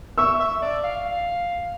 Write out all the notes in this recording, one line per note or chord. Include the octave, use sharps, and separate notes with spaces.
E5 C#6 E6
E5
D5
F5
F5